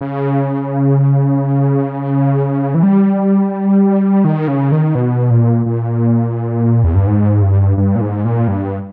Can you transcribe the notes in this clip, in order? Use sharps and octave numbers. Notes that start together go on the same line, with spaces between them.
C#3
E3
G3
D#3
C#3
D#3
B2
A#2
A#2
E2
G2
G#2
G2
G2
A#2
G#2
A#2
G2